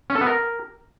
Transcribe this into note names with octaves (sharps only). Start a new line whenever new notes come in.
C#4
A4
B3
A#4